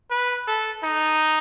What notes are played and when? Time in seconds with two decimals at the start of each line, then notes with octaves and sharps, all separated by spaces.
0.11 B4
0.47 A4
0.84 D#4